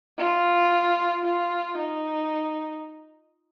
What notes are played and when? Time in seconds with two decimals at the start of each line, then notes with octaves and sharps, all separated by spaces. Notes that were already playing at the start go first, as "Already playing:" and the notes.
0.18 F4
1.25 F4
1.78 D#4